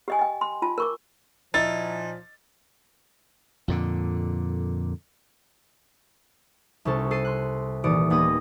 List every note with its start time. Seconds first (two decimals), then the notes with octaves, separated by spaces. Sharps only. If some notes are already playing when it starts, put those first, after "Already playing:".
0.08 G4 D#5 G#5
0.19 D#5 G5
0.41 C6
0.62 F4 A5
0.78 A#4 C#6 D6
1.54 A#2 F3 D#4 E4 A6
3.68 F2 A#2 D3
6.85 C2 C3 C#4 A4
7.11 A4 C7 D#7
7.25 C6 F#6
7.84 D#1 E3 D5 D#6 C#7 D7
8.10 D#2 B3 D#6 A#6